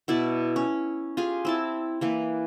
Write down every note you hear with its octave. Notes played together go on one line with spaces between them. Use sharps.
B2 E4 D5 A5
C#4
F4 G4 G#4 G#5
C4 E4 A5
E3 A#3 B4